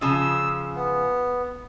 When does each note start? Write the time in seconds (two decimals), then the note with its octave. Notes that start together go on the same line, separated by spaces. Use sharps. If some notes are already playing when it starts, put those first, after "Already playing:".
0.01 C#3 F3 E6
0.75 B3